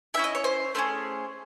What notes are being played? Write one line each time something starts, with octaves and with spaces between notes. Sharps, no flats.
C#4 E4 G#4 E5
D#5
C#5
C5
A3 C#4 G#4 C5